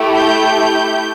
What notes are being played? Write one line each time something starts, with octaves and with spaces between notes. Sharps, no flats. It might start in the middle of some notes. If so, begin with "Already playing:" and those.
Already playing: A3 E4 G4
G6